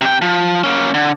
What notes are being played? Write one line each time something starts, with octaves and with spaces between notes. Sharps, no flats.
C3 G5
F3
A#3 C#4
D3